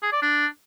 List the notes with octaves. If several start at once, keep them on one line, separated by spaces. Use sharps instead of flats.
G#4
D5
D4